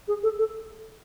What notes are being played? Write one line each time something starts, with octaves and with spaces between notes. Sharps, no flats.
G#4
A4
A4